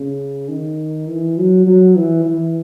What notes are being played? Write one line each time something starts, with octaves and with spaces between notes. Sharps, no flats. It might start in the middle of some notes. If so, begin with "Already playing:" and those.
Already playing: C#3
D#3
E3
F#3
F#3
E3
E3